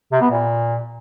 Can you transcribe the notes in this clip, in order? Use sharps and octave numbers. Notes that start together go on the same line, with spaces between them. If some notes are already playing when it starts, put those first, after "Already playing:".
C3
B3
A#2